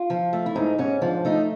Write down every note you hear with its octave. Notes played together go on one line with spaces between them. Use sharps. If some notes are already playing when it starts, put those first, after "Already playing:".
Already playing: F4
F3
A3
E4
G#2 D#4
G#2 C#4
F3 D4
A3 D#4